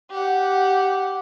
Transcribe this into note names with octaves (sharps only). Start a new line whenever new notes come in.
G4 F#5